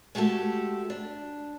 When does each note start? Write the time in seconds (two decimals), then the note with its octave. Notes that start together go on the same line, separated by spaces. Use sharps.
0.15 G#3 A3 F#4 G4 A4
0.90 D4